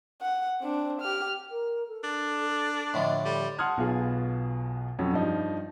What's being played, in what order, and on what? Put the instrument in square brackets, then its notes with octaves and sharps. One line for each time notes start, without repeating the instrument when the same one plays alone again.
[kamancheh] F#5
C4 D4
G4 F6
[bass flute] A#4
A4
[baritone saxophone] D4
[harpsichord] A2 D3 F3 [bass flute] D#5
[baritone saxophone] G3 [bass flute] A4
[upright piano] F#5 A5 C6 D#6 F6 G#6
B1 B2 B3 F4 G#4
F2 F#3 C#4
G2 F3 D#4